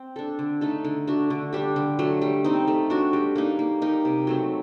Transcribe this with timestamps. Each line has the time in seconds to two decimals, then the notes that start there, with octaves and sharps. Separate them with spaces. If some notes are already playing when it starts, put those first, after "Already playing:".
Already playing: C4
0.16 D4 A4
0.39 D3
0.61 A3 D#4 A4
0.85 D3
1.07 A3 D4 F#4
1.30 D3
1.53 G3 D4 G4
1.76 D3
1.99 F#3 A3
2.22 G3
2.44 C4 D#4
2.67 A3
2.90 D4 F#4
3.13 G3
3.36 A#3 D#4
3.59 A#3
3.82 D#4 G4 A#4
4.05 C3
4.27 F#3 A3 C4